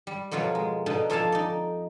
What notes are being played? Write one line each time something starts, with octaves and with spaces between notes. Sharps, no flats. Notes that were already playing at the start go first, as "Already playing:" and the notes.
G3
F2 B2 F#3 F4 A#4
G#3
B2 D3 D#4
F2 A4 F5 G#5 A5
D#4 D5